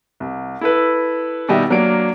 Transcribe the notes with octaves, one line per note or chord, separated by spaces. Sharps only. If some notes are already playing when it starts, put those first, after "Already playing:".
C2
E4 A4 B4
B2 D#3 G3 D#5 E5
F#3 A#3 D4 A#4 D7